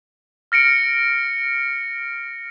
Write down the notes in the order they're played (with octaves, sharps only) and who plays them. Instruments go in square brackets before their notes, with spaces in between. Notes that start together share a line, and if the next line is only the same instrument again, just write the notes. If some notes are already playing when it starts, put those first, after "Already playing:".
[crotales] F6 A#6 C#7 D7